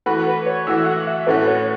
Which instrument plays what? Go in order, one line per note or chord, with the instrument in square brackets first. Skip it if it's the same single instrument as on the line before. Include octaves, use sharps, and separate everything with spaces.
[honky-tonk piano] E3 A3 F#4 [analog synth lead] B4
[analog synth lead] B4
C#5
[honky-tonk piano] E3 A3 F#4 [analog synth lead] E5
[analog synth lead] F#5
E5
[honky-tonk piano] A2 A3 C#4 F#4 [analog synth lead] B4
[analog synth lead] C#5